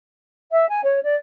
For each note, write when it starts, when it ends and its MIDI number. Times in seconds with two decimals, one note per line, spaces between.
0.51 0.67 76
0.68 0.80 80
0.83 0.99 73
1.04 1.15 74